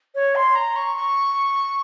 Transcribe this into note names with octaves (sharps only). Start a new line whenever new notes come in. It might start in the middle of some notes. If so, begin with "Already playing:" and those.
C#5
C6
A#5
C#6
C#6